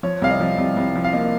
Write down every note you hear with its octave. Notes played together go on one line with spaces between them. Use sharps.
F3 C#5
C2 F5
D#5
F3
C2
C2
F3
F5
A#3 D#5